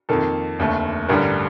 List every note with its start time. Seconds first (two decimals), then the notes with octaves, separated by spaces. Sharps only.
0.09 F2 D#3 A#3 A4
0.59 F1 D#2 D3 A3
1.09 A1 G2 D3 G3 A#4